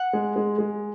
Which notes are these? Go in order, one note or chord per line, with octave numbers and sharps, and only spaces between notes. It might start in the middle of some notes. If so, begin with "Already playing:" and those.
Already playing: F#5
G#3
G#3
G#3